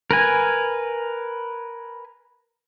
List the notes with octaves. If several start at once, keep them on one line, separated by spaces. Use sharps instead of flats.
A#4 B4 G#5